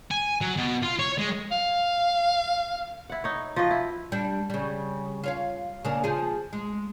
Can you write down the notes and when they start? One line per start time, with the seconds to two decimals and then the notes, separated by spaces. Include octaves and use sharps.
0.11 G#5
0.41 F#3
0.57 B2
0.82 F4
0.99 C#5
1.18 G#3
1.52 F5
3.10 E4 F#5
3.24 D#4 C#5
3.56 F3 F#4 B4 D#5
3.71 E4
4.12 G3 D4
4.50 C#3 G3
5.23 F4 C#5 F5
5.85 C#3 A#3 D4
6.04 F3 G#4
6.53 G#3